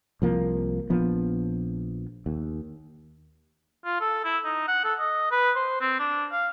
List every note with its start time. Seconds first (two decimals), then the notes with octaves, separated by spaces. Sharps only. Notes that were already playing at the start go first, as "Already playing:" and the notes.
0.22 C2 F3 A#3
0.90 A#1 F3 B3
2.26 D#2
3.85 F4
4.00 A4
4.25 E4
4.44 D#4
4.68 F#5
4.84 A4
4.99 D#5
5.31 B4
5.56 C5
5.81 C4
5.99 D4
6.32 F5